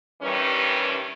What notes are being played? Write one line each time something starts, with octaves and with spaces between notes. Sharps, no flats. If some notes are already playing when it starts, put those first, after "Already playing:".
G2 D#3 E3 G3 C#4